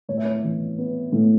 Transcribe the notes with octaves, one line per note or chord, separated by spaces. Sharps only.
A2 C#5
E5
C#5
E3
B3
A2